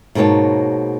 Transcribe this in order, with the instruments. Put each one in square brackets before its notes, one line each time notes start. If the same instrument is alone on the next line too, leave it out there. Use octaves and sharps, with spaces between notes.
[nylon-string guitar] G#2 B2 A#3 G#4 C#5 A5